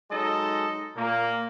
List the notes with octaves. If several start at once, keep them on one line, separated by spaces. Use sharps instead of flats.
F#3 G#3 D#4 A4 D#5
A#2 A#3